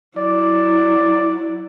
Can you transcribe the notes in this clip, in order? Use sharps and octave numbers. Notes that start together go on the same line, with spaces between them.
F#3 E4 D5